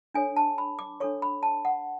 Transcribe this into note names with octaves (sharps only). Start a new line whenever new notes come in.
D4 A4 C#5 G#5
A5
B5
D6
D4 A4 C#5 C#6
B5
A5
F#5